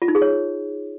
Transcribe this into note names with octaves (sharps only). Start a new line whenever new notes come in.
F4
D#4
G#4
C#5